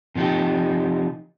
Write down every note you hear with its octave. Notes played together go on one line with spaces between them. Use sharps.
C3 F3 C#4 D#4 G4